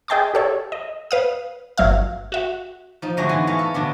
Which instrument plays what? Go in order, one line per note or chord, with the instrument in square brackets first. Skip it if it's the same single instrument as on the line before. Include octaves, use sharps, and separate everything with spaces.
[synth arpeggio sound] G#4 D#5 G5 A5 C6 D6
G4 A4 C#5
D#5
B4 F5 D#6
G1 F#3 E5 F5
F#4 E5 F#5
[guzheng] F3 D#4
D3 F#3 G#3 A3 F#4
E3 B3 G#5
A3 C#5 D#5 F5
A4
B2 D3 B3 D4